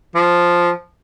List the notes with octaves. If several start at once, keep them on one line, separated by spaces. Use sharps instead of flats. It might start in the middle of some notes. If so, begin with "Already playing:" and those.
F3